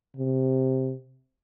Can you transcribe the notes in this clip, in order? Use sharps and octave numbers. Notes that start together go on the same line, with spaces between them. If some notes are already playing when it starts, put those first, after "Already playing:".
C3